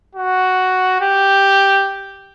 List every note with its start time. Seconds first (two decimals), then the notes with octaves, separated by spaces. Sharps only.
0.15 F#4
1.01 G4